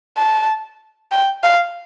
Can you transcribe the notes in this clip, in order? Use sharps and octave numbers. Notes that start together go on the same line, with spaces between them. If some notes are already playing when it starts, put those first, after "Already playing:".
A5
G5
F5